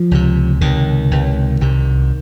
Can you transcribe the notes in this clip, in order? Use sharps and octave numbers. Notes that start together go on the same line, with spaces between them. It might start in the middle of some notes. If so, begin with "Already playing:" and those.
Already playing: F3
C#2 C3
C#2 C3 D#3
C#2 C3
C2 C3